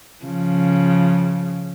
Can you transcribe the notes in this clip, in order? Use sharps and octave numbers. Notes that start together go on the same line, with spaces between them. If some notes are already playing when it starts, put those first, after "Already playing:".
C#3 F3